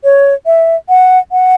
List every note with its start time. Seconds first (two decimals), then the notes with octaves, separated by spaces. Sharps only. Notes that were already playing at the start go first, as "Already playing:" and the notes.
0.04 C#5
0.46 E5
0.89 F#5
1.32 F#5